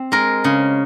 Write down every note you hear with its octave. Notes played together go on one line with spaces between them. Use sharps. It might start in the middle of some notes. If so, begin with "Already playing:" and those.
Already playing: C4
G#3 A#4
C#3